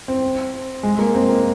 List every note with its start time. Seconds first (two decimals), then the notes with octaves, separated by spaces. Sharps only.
0.08 C4
0.83 G#3
0.99 A#3
1.15 C4
1.29 A#3